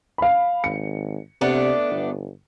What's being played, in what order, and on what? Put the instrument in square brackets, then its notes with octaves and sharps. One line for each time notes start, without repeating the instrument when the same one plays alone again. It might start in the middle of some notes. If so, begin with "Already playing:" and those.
[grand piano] F5 B5
[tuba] G#1 [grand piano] C#7
[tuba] C3 [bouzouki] A3 B3 D4
[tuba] G1